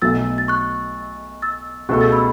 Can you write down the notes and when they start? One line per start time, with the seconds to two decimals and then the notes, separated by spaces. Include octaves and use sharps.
0.02 B1 B2 A3 F#4 E6 A6
0.38 A6
0.48 C#6 F#6
1.42 E6 A6
1.89 C#2 B2 A3 F#4 A4 C#6 F#6
2.01 E6 A6
2.12 B5 E6